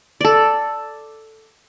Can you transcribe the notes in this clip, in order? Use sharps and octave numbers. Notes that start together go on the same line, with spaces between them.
A4 D5